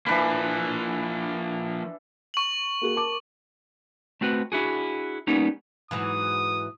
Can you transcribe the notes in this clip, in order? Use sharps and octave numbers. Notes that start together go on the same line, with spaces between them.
E3 F3 A#3 D4 B5
C#6 F#7
A#3 F#4 G#4
A#4 A5 D6
A3 C4 F#4 B4
D4 E4 F#4 G#4
G3 A#3 B3 C#4 D#4
G#2 E3 F#3 D#6